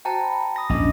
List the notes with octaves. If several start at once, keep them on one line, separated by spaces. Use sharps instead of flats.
F#4 C5 G5 A5 A#5
B5
D#6 A#6
A#1 E2 G#2 C#4 D4 D#5